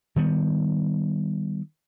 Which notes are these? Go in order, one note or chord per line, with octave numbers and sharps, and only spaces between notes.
D#3 G3 B3